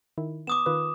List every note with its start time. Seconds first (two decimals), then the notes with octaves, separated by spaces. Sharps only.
0.18 D#3 E4
0.47 B3 D6 D#6 E7
0.66 D#3 F4 B4